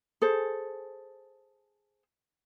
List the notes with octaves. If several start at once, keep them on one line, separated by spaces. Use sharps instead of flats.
G#4 A4 C5